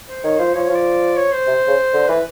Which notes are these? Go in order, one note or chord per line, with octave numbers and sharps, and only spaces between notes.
C5
D#3 C#5
F3 C5
F3 C#5
C#5
F3 D5
C#5
C5
C3
C#3
D3
E3 B4